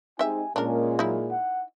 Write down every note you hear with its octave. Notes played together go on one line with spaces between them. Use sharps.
G#3 C4 D#4 G4 E5 G#5
A#2 G#3 A#3 C#4 D4 A#4
F#3 D#4 E4
F#5